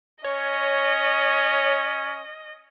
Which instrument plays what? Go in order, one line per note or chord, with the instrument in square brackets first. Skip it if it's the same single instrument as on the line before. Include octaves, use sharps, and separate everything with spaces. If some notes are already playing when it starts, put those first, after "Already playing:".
[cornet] C#4 [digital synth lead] C#5 [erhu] D#5